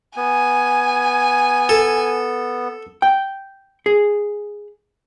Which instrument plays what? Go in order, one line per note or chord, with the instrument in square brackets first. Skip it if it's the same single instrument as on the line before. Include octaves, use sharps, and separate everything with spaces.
[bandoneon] B3 [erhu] G#5
[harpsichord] A4
[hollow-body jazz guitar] G5
G#4